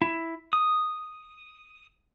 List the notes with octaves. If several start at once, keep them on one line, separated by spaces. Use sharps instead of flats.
E4
D#6